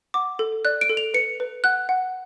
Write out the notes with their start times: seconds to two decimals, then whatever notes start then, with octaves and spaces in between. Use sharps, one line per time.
0.14 F#5 D6
0.39 A4
0.65 D5 F#6
0.81 D7
0.90 A4
0.97 F7
1.14 B4 C#7
1.40 B4
1.64 F#5 F#6
1.89 F#5